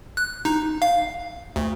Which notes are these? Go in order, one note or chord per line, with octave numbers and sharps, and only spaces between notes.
F#6
D#4
F5
D2